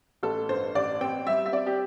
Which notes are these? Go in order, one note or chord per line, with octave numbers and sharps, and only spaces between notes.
A1 A4
G2 C5
A1 D5
C4 G5
G3 E5
E5
C4 D5
G4